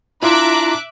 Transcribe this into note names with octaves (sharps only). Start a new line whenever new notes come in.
D4 E4 F4 E5 A#5 C6 D6 F#6